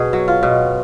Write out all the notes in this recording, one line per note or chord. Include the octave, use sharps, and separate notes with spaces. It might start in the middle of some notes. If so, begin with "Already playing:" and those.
Already playing: B2 G#4
F#3
F4
B2